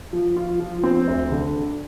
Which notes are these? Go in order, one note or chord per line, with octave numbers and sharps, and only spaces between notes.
F3
F4
F3
C4
D2
D3